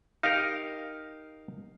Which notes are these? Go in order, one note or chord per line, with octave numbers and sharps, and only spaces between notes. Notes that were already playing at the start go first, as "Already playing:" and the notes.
D#4 G4 A#4 F5